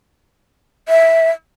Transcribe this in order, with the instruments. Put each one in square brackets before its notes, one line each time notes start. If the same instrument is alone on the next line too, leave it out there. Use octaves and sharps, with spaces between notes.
[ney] E5